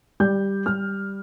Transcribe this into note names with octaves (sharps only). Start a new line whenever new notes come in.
G3 G6
G3 F6